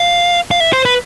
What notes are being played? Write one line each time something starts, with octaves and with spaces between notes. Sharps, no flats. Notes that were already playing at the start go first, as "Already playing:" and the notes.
Already playing: F5
F5
E5
C5
B4